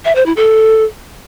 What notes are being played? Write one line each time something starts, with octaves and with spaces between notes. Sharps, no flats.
E5
C5
E4
A4